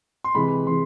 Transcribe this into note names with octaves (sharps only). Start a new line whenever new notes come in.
C6
C3 E3 G#3 B5
C3 E3 G#3 C6